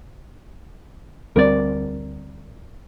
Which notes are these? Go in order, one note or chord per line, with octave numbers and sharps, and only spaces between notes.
D2 G3 C4 A#4 D5